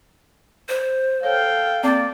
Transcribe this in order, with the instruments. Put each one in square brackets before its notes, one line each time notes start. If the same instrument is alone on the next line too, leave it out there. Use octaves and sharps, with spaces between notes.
[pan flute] C5
[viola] A4 G5 [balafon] C#5 [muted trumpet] F5
[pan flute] A#3 [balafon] C4 A5 [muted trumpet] D5